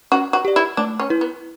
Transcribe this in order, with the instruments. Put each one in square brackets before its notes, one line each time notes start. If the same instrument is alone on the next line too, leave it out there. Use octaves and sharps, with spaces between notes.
[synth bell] C#4 [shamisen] F#4
[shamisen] F#4
[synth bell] G4 D5
[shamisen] E4
[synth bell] A3 [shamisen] D4
[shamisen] C#4
[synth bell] E4 B4
[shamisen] B3